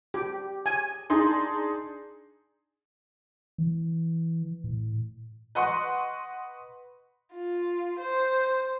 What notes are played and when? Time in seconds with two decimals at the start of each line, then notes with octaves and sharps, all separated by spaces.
0.14 G4
0.66 G#5
1.10 D4 D#4 G#4 C6
3.58 E3
4.64 A2
5.55 B4 D#5 F#5 C6 C#6
7.34 F4
7.99 C5